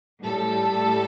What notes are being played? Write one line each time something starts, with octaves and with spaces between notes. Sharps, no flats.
A2 G3 A4